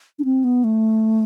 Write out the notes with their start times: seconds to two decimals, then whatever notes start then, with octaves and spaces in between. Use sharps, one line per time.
0.19 D4
0.24 C4
0.44 B3
0.64 A3